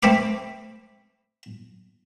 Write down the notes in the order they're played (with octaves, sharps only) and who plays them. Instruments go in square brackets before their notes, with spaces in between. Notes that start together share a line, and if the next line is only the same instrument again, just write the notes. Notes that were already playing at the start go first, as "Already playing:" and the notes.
[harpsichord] A3 C4 C5 B5 D6